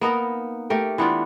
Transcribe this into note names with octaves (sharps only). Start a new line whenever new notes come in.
A#3 B3 D#4 A#4
A3 G4 A#4 G5
E3 B3 D4 F4